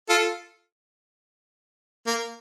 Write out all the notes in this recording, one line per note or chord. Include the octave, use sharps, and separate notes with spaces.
F4 A4
A#3